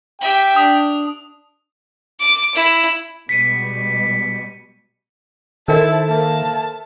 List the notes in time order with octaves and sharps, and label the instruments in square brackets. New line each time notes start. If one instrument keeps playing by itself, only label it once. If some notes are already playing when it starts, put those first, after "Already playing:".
[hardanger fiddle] G4 E5 [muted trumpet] G5
[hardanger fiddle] D4 [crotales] D#6
[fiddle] D6
E4
[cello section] B2 G3 G#3 [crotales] B6 C#7 D#7
[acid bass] D#3 [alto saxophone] E4 [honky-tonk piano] A4 C5 E5 [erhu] A5
[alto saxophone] A#3 [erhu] A5